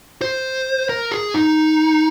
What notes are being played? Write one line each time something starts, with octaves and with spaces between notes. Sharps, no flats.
C5
A#4
G#4
D#4